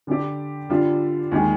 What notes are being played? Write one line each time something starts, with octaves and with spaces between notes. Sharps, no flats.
D3 G3 D4 G4
D3 G3 D4 F4
D#2 D#3 G#3